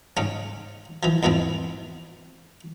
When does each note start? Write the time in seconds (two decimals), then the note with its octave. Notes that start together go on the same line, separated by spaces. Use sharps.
0.17 G#2 C#3 C#4
1.03 E3 F3
1.23 E2 G#2 E3 F3 C4